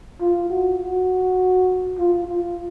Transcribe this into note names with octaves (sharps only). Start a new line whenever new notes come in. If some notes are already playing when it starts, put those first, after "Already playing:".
F4
F#4
F#4
F4
F4